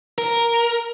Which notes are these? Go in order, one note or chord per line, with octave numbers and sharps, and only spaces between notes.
A#4